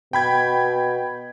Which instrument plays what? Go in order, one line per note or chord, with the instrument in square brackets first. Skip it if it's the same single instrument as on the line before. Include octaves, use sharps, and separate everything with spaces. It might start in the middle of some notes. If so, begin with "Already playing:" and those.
[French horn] B2 [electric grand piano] G5 B5 G#6